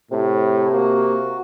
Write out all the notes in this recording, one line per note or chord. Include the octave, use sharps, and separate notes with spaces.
A2 C3
A#3 F#4